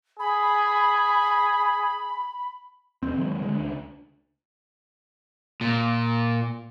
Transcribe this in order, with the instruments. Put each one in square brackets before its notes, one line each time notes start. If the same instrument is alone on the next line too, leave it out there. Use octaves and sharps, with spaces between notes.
[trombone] G#4 [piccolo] B5
[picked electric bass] D#1 E2 C4
D#3 F#3 G#3
D3 G#3
C#2 D4
[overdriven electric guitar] A#2